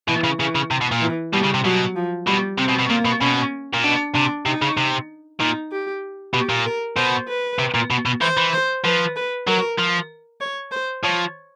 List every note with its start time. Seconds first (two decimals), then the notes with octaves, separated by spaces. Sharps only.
0.08 B2 E3
0.24 C#3
0.39 C#3 E3
0.55 C#3
0.71 C3
0.81 B2
0.92 A#2
1.02 E3
1.33 B2 G3
1.44 C#3
1.54 C3
1.65 B2 F#3
1.96 F3
2.27 B2 G3
2.58 C3 C4
2.69 B2
2.79 B2
2.90 A#2 A#3
3.05 B2
3.21 B2 C#4
3.74 A#2
3.84 B2 D4
4.14 C3 D4
4.46 C3 D#4
4.62 C#3
4.77 C3
5.39 A#2 D#4
5.72 G4
6.33 B2 G4
6.49 A#2
6.65 A#4
6.96 B2 C5
7.28 B4
7.59 C3
7.74 A#2
7.90 B2
8.06 B2
8.21 E3 C5
8.37 E3
8.53 C5
8.84 F3 B4
9.16 B4
9.47 F#3 A#4
9.78 F3
10.41 C#5
10.71 C5
11.03 F3 C#5